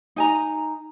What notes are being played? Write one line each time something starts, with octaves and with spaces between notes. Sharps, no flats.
D#4 G#5 A#5